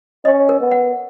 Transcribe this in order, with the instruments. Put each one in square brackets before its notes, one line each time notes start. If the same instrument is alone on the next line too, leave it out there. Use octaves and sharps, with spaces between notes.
[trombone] C#4 [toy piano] D#5
[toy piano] A#4
[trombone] B3
[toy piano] F#5